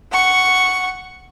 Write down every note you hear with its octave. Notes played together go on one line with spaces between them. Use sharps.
F#5 C#6